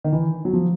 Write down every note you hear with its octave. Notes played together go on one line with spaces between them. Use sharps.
D#3
E3
F#3
F3